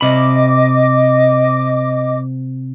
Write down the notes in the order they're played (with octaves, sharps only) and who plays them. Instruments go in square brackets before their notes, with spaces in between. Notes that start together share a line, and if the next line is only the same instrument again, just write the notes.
[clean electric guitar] C3 B5 [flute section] D#5 D6